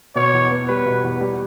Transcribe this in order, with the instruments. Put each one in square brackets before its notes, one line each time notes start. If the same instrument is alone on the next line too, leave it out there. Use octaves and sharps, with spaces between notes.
[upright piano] B2 [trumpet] C#5
[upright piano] E2
B3
[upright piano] G3 [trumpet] B4
[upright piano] B2
E2
G3